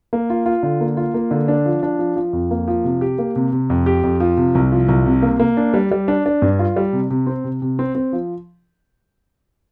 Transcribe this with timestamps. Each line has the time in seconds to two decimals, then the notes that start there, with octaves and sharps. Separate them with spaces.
0.13 A#3
0.30 F4
0.46 F4
0.63 D3
0.81 A#3
0.97 F4
1.14 A#3
1.31 D3
1.48 D4
1.66 F3
1.83 D4
1.99 F3
2.16 F3
2.33 F2
2.51 A#3
2.68 F3
2.84 C3
3.01 G4
3.18 A#3
3.36 C3
3.53 C3
3.70 F2
3.86 G4
4.04 F2
4.20 F3
4.37 C3
4.55 C2
4.72 F3
4.88 C2
5.06 C3
5.22 A#3
5.40 A#3
5.57 D4
5.74 G3
5.91 G3
6.08 D4
6.26 D4
6.42 G2
6.59 F4
6.76 G3
6.93 C3
7.10 C3
7.27 C4
7.44 C3
7.62 C3
7.79 C4
7.95 C4
8.13 F3